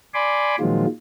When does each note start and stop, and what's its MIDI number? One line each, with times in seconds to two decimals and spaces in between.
0.14 0.56 74
0.14 0.56 80
0.14 0.56 83
0.14 0.56 84
0.14 0.56 86
0.60 0.86 46
0.60 0.86 51
0.60 0.86 53
0.60 0.86 54
0.60 0.86 56
0.60 0.86 65